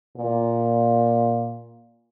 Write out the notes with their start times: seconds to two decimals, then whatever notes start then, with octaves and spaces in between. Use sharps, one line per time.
0.16 A#2